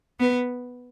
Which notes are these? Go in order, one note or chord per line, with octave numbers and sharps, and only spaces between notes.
B3